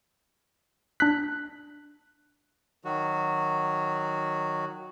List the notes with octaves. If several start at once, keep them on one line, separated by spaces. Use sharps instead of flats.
D4 F#6 B6
D#3 F#3 F#4